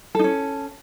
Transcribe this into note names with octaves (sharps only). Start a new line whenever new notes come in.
C#4 D#4 A4